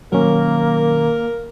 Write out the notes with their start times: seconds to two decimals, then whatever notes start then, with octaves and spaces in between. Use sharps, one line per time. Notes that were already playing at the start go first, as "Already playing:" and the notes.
0.12 B2 D#3 F#3 A#3 C#4 A#4